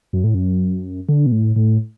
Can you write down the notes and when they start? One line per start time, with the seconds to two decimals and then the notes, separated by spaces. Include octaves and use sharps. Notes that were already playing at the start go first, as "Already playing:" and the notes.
0.13 F#2
0.24 A2
0.34 F#2
1.09 D3
1.26 B2
1.32 A2
1.56 A2